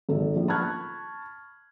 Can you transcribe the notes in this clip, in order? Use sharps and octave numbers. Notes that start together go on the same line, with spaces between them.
G#1 A4
A#1
A5 B5 C#6 F6 F#6 G#6